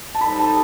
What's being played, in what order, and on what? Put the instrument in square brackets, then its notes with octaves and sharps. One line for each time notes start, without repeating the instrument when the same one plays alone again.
[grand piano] A5
[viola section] G3 D#4 A4 C5 [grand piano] B5
[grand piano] A5